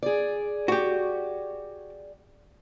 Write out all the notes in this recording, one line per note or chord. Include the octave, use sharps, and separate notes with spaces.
G#4 D5
F#4 G4